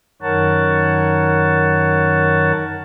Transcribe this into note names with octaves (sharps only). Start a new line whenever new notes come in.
F#2 D#3 A#4 C#5 F#5 A5